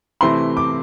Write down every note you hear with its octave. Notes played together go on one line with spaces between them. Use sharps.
C3 E3 A3 C4 E4 C6
D6